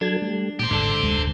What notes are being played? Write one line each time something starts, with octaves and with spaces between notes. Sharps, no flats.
F#3 D4 A4 G#6
G3 A3
A#2 G4 C5
D#1 G#1 G#2 D3 D4 A4
F1 D2 G#3